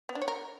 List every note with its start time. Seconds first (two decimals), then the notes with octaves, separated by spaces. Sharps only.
0.09 B3
0.15 D4
0.22 C#5
0.28 A#4